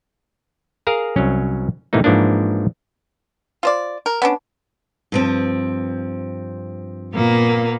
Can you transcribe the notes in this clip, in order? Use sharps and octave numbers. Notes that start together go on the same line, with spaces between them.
G#4 A#4 F5 A#5
C2 F#3 C#4
A2 C3 E3 A#3 D#4
G#2 E3 F3 A#3 D4
F4 C5 D5
A#4
B3 C#4 D4
G2 F3 C4
A#2 A#3 B3